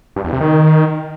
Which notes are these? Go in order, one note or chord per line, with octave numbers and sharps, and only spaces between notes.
G2
E2
C3
D#3